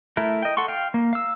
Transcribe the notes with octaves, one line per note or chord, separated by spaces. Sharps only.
A3 E4 A#4
D#5 G5
A4 F#5 C6 C#6
F5 G5
A#3
F5 E6